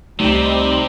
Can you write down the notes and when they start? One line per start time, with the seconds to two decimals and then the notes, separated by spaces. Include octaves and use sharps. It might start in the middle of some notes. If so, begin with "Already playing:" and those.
0.20 C#2 C3 G3 A3 C4 D#4